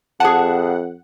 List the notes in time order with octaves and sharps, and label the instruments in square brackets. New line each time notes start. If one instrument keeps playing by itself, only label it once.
[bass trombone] F2 [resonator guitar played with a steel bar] G#4 A5 [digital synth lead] F#5